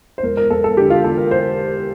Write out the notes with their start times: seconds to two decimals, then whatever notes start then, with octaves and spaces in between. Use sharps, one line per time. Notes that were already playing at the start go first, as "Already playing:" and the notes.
0.18 C5
0.23 E1 A#4
0.37 A#4
0.50 E1 A4
0.64 A4
0.77 D3 G4
0.90 F4
1.04 E2 A4
1.18 A#4
1.31 C5